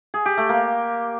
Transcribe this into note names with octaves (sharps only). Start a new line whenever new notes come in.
G#4
G4
A3
A#3